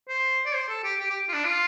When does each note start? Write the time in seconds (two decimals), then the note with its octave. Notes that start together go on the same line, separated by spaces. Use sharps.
0.09 C5
0.46 D5
0.55 C5
0.69 A4
0.84 G4
1.00 G4
1.10 G4
1.29 F4
1.33 D4
1.44 F4